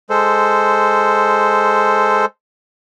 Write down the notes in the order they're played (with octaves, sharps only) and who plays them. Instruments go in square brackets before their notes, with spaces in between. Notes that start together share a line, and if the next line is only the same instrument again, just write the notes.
[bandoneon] G#3 A4 C5